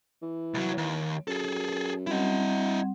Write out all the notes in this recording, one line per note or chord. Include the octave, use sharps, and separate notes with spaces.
E3
C2 F#3
D#2
F#2 G#4 A4
G3 C4 E4 D#5 F#5